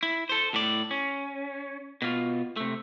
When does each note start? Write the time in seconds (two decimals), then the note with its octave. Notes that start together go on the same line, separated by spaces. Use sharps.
0.03 E4
0.29 A4 C5
0.54 A2 D5
0.91 C#4
2.02 B2 F4
2.57 C3 A3